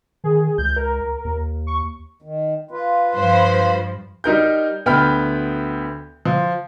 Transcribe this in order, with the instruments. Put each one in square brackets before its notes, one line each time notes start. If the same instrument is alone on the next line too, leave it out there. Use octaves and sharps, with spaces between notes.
[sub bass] D#3 [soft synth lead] G#4
[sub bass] C#2 [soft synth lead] G6
[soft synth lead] A#4
[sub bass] D#2
[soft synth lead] C#6
[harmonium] D#3
F4 B4
[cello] G2 F3 [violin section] C5 B5
[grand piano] G3 D#4 A#4 G6
D2 B3 G5 B5 F6 G6
F3